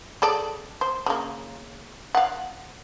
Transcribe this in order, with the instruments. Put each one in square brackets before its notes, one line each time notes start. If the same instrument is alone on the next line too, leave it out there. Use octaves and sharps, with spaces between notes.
[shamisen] G#4 A4 D5
C5
C#3 A#3
F5 F#5